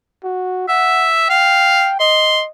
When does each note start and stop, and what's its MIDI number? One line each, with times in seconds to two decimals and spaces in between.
0.24 0.65 66
0.69 1.29 76
0.69 1.09 78
1.30 1.90 77
1.30 1.98 79
2.00 2.50 75
2.00 2.41 84